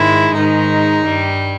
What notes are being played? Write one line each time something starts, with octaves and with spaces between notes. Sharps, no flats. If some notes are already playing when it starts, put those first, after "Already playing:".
Already playing: G#2 D#3 G#3 E4
G#2 D#3 G#3 D#4
G2 G3